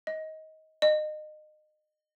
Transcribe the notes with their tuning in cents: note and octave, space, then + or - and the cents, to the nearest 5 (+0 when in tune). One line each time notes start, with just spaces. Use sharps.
D#5 +20
D#5 -30